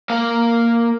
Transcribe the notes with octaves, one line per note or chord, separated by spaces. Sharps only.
A#3 F5